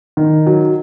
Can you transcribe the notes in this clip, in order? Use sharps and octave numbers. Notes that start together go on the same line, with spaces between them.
D#3
F#3